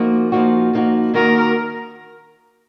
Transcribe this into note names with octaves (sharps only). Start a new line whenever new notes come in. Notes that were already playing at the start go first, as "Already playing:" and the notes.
Already playing: F3 A#3 D#4 F#4
F3 A#3 D#4 F#4
F3 A#3 D#4 F#4
D#3 A#3 D#4 F#4 A#4